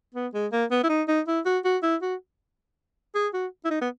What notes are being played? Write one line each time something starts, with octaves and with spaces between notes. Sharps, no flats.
B3
G#3
A#3
B3
E4
D#4
D#4
E4
F#4
F#4
E4
F#4
G#4
F#4
E4
D#4
B3